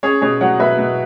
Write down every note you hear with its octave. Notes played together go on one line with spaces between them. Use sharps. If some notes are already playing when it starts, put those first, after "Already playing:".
C#4 G#4 C#5
B2 G#4 C#5
F#3 C#5 F#5
B2 B4 E5
B2